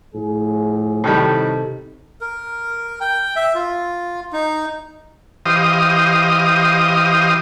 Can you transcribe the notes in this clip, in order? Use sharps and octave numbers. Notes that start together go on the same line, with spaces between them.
A2 F3 G#4
A2 C3 D#3 G3 D#4 A4
A#4
G5
E5
F4
D#4
E3 G4 C5 D#5 F5 D#6